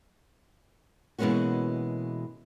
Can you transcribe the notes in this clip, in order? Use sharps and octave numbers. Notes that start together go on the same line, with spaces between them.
B2 E3 G#3 A#3 C#4 F#4